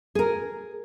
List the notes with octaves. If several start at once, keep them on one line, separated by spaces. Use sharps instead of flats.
G#4 A#4